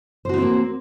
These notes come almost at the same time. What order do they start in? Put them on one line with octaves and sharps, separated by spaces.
C5 F#4 D#4 C4 A#3